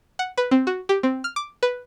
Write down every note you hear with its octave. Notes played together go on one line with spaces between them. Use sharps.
F#5
B4
C4
F#4
G4
C4
F6
D6
B4